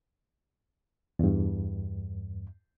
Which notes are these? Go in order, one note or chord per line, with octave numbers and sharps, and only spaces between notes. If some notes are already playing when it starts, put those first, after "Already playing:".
E2 G2